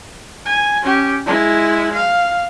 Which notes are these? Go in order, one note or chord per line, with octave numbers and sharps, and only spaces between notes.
G#5
C#4 G4
G#3 E4
F5